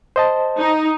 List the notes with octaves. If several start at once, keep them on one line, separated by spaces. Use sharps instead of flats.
C5 D#5 A5
D#4